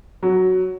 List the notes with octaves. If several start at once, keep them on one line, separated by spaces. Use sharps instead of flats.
F#3